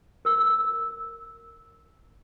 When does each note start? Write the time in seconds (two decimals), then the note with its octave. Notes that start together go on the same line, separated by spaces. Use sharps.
0.25 A#4 E6